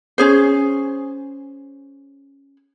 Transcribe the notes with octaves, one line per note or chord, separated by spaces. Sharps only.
C#4 G#4 C5